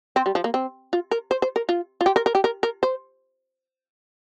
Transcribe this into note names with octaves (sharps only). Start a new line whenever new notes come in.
C4
G3
F3
A#3
C4
F4
A#4
C5
C5
A#4
F4
F4
G4
A#4
A#4
G4
A#4
A#4
C5